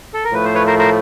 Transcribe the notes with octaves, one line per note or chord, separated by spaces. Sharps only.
A4
A#4
A2 F3 A3 B4
C5
B4 C#5
A#4 C5
A#4 C5